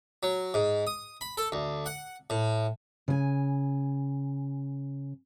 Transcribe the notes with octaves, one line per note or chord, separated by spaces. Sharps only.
F#3
G#2
D#6
B5
A4
D2
F#5
A2
C#3 G#5